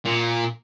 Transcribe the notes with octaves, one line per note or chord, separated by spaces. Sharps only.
A#2